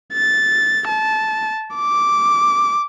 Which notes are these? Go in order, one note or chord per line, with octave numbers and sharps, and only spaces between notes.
A6
A5
D6